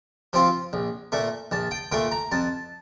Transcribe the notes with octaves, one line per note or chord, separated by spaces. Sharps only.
F3 C4 F4
A#1
A#2 A3
A#1 A5
G5
A#2 A3 G5
A#5
F2 A5